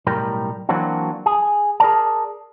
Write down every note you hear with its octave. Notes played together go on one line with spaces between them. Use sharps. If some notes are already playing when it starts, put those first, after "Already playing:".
B1 A2 G3 A#4 G5
E3 F#3 A#3 C4 D4 F#4
G#4
G#4 A#4 D5 A5